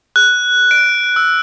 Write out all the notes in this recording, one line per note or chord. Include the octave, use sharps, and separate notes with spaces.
F#6
D7
E6